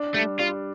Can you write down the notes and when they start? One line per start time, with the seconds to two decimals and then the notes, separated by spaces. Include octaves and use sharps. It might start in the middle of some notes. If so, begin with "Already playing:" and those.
Already playing: D4
0.14 G3 A3
0.39 G3 F4